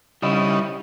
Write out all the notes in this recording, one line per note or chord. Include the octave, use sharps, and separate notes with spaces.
C#3 G3 D#4 E4